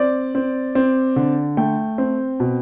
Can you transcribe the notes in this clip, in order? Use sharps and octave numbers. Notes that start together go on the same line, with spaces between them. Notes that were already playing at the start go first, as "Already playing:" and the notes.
Already playing: C4 D5
C4
C4
D3
A3 G5
C4
B2